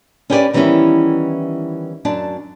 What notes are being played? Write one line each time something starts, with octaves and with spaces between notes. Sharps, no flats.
C#4 D4 G4 B4 C5 D5
D#3 E3 G3 B3 C#4 E4
F#2 D4 A5